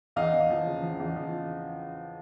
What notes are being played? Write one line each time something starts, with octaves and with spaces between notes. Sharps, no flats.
E2 D#5 F5
E2
F3
C#3
F3
E2
F3